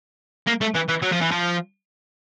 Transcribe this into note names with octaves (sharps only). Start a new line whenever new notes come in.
A#3
A3
E3
E3
F#3
F3
E3
F3